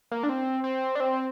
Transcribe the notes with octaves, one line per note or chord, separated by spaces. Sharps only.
A#3
D4
C4
C4
D4
C4